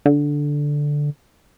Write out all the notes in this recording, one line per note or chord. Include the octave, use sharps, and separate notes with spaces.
D3